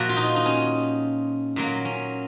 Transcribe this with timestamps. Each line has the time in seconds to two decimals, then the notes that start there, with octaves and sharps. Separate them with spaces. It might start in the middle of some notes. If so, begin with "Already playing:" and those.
Already playing: A#2 F3 F#4
0.09 F4
0.17 D#4
0.36 D#4
0.46 C#4
1.56 A#2 F#3 A#3
1.85 C#4